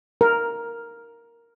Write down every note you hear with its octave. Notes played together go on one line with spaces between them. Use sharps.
A#4